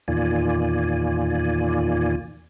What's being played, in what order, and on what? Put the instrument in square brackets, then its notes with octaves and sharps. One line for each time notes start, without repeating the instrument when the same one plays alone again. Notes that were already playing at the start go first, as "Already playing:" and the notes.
[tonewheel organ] E2 A#2 D#3 F4 D5 G#5